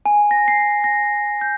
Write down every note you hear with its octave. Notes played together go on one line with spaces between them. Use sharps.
G#5
A#6
C7
A#6
G6